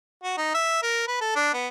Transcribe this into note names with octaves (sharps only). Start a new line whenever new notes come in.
F#4
D#4
E5
A#4
B4
A4
D4
B3